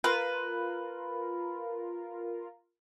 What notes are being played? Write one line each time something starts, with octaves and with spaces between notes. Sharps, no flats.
F4 A#4 B4